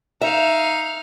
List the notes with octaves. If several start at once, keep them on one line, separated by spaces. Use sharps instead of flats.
D#4 E5 F5